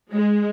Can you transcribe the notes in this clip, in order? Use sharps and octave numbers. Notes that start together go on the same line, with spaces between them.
G#3